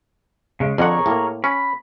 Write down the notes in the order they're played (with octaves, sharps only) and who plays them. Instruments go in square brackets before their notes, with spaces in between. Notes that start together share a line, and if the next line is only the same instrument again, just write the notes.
[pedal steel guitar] C#3 G#3
[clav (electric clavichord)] F2 D3 F#5 [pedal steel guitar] G#4 A#4 C#5
[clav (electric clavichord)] A2 A#3
[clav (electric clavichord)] C#4 [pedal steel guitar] B5